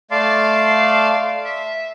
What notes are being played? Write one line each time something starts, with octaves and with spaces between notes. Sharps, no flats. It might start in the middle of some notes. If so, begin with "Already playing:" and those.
A3 D5 F5 A5 C6 D6
E5